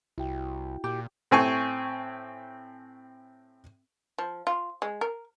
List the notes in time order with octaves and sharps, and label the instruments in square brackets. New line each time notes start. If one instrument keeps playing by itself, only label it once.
[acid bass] C2 [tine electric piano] E4 F#4 G5
[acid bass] A#2 [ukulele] G4
[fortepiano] A2 C4 G#5 C#6
[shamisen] F3
F4
G#3
A#4